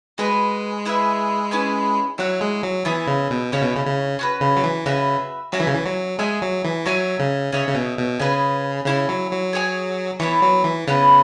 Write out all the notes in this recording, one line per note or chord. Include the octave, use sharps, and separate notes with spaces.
G#3 F#4 B4 G#5
E4 G#4 B4 E5
C#4 E4 B4 G#5
F#3 E4 C#5 F#5
G#3
F#3
E3 B3 G#4 E5
C#3
B2
C#3 C#4 E4 C#5
B2
C#3
C#3
C#4 F#4 B4
C#3
F#3
E3
C#3 F#4 B4 E5
F#3 C#4 F#4 E5 G#5
E3
C#3
E3
F#3
G#3 G#4 E5 G#5
F#3
E3
F#3 F#4 C#5 E5 G#5
C#3
C#3 G#4 C#5 E5
C#3
B2
B2
C#3 G#4 B4 G#5
C#3 E4 C#5 G#5
F#3
F#3
G#4 C#5 G#5
E3 B3 E4 C#5
F#3
E3
C#3 B3 E4 B4 F#5